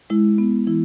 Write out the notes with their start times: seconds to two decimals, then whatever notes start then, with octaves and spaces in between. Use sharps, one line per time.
0.10 G#3 E4
0.38 B3
0.67 E3 E4